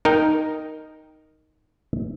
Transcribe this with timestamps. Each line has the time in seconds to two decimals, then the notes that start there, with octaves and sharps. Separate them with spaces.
0.05 D#4 A#4 D#5 G5